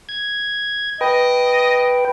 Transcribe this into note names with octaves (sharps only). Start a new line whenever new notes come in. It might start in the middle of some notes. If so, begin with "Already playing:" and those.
G#6
B4 D#5 G5